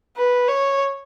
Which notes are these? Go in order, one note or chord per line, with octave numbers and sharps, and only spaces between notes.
B4
C#5